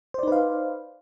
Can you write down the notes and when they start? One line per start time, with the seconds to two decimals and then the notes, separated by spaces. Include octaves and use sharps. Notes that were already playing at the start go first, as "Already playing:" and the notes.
0.14 C5
0.19 D5
0.23 D#4
0.28 B4
0.32 F5